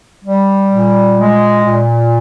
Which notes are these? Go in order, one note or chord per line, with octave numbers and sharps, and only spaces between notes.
G3
A#2
G#3
A#2